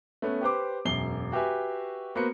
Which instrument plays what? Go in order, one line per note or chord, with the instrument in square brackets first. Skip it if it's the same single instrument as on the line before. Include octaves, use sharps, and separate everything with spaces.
[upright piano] A3 B3 C#4
G4 B4 C5 D6
E1 F#2 C7 G7
F#4 G4 B4 E5 G#5
A#3 B3 F#4 B4 C5 C#7